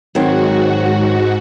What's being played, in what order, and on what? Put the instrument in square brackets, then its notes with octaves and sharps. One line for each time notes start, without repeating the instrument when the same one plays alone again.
[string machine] G#2 F#4 [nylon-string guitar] D#3 F#3 C4